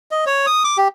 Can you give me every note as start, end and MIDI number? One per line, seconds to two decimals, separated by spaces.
0.11 0.25 75
0.26 0.46 73
0.46 0.63 87
0.64 0.77 86
0.77 0.88 67